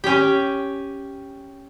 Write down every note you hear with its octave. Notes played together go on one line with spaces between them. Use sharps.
C#4 G4